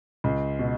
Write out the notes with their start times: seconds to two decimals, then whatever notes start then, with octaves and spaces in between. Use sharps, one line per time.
0.24 C#2
0.59 B2